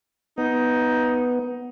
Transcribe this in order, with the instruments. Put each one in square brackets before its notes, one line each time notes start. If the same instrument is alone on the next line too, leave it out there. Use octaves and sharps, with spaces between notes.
[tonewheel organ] B3 [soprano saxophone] D#4